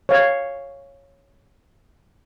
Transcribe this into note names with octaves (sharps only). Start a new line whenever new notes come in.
C#5 F5